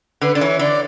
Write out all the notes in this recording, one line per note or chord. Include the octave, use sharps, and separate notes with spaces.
D3 B4
D3 D5
E3 C#5
D3 D5